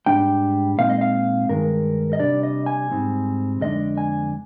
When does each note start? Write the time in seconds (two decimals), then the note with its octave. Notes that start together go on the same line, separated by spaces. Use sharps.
0.06 G#2 G3 D4 G5
0.78 A#2 G#3 C4 D#4 F5
0.90 D#5
1.01 F5
1.49 G2 D#3 G#3 A#4
2.13 D#5
2.19 C3 G3 D4 D5
2.43 D#5
2.66 G#5
2.91 G#2 G3 C4 D#4
3.61 F2 D3 G#3 D4 D#5
3.98 G#5